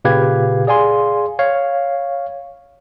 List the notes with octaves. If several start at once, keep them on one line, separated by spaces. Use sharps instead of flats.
A#2 C#3 G4 B4 F5 G#6
G#4 D5 F5 G#5 C6
C#5 F5